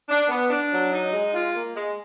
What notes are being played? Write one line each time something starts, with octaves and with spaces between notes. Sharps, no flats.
D4
B3
D4
F#3
D#4
G#3
F4
A#3
G#3